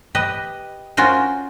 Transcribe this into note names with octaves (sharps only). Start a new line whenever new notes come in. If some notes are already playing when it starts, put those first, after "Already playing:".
G4 B4 D#5
C#4 F4 F#4 A#4 C5